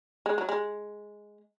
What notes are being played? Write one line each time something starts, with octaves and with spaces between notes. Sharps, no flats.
G#3
F#3
G#3